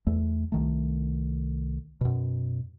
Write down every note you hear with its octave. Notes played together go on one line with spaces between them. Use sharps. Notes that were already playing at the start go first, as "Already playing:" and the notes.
E2 A3
C2 D#3 A3
F#2 B2